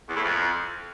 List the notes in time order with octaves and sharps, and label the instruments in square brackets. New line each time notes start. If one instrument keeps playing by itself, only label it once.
[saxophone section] E2
A2
F2